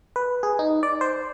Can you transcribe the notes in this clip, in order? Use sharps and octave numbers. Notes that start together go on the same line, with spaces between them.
B4
G#4
D#4
D5
C5